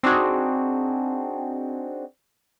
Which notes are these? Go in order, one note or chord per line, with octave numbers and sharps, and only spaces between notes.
C4 D4 D#4 F#4 G#4